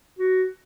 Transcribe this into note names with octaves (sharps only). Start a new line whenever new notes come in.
F#4